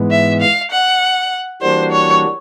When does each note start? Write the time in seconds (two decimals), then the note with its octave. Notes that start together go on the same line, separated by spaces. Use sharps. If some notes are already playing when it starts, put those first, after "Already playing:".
Already playing: G#2 E3 G#3 B3
0.11 E5
0.41 F5
0.71 F#5
1.62 E3 G3 A#3 D4 F#4 C5
1.92 C#5